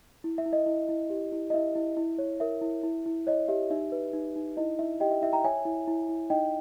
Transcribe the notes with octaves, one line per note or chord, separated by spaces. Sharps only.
E4
E5
E4
D#5
E4
E4
G4
E4
D#5
E4 E5
E4
E4
C#5
A#4 E5
E4
E4
E4
C#5 D#5
G4 E5
D#4 E5
B4
D#4
D#4
E4 D#5
E4 E5
G4 D#5 G5
E5
E4 E5
G5 A#5
C#5 E5 G#5
E4
E4
E4
D#4 D#5 G5